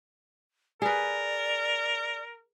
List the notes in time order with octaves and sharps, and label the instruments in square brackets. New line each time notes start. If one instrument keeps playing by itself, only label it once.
[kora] G#4 B4 [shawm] A#4 [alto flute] D5